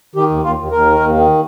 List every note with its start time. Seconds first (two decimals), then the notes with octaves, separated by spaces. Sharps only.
0.15 D#3 G4
0.30 D#2
0.43 D#2 F4
0.58 D#2
0.71 D#2 A#4
0.86 D#3
1.00 D#2
1.14 D#3